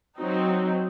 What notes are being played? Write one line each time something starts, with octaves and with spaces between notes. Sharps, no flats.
F#3 C4 D#4